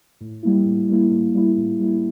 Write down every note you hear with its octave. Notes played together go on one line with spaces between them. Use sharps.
A2
G3 A#3 E4
A2
G3 A#3 E4
A2
G3 A#3 E4
A2
G3 A#3 E4